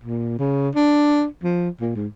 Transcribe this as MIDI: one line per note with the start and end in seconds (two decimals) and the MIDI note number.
0.04 0.37 46
0.39 0.70 49
0.75 1.25 62
1.43 1.69 53
1.81 1.91 46
1.96 2.07 44